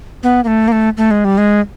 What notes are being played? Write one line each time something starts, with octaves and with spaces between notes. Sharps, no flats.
B3
A#3
A3
A#3
A3
A3
G#3
G3
G#3